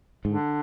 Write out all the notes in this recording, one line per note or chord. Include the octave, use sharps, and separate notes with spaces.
G#2 D3